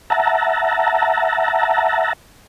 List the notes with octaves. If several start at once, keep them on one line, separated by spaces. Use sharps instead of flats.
E5 F#5 A5 A#5